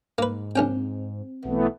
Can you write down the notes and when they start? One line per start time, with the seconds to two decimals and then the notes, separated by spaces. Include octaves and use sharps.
0.18 G#2 A#3 B4
0.56 A#1 C4 C#4 G5
1.45 B1 E3 A3 B3